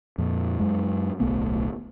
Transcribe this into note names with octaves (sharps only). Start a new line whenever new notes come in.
F2 A#2
F#2 G#3
D1 B1 A3 B3